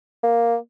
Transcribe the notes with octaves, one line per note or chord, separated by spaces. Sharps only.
A#3